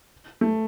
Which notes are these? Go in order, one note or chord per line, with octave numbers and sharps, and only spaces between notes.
A3